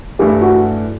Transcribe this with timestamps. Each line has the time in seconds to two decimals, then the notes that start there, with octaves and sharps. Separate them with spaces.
0.19 G2 E3 A3 G4
0.41 F#4